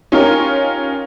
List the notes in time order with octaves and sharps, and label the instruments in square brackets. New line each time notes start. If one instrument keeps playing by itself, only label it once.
[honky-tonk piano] C#4 D#4 F4 G4 A#4 C#5